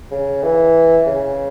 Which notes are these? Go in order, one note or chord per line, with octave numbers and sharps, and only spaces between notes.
C#3
E3
C#3